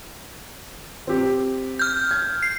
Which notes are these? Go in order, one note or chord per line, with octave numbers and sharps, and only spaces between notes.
C4 G4
F6 G6
G#6
C7